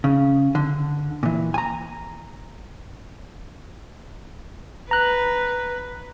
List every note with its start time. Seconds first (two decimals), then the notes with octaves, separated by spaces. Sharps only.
0.04 C#3
0.55 D3
1.23 A#2 E3
1.54 G#5 A#5
4.91 B4 A#5 F#6